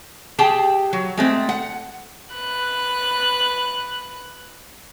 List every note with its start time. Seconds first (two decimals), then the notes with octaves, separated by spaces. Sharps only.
0.38 G4 G#4 G5 A5
0.93 F#3
1.17 G#3 A3 C4
1.49 F#5
2.34 B4 F#6